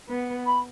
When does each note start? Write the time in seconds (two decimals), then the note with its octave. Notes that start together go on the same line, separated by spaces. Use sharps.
0.09 B3
0.46 B5